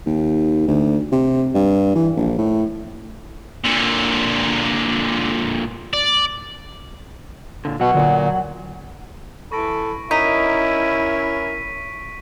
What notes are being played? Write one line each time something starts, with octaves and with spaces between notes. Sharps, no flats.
D#2
D2
C3
G2
E3
A#1
A2
A#2 D3
D5
A#2 D3
B2 F#3 F#5
A#2 D3
E3 A4 B5 C#6 A#6 D7
C#4 D#4 E4 A#4 B6 D#7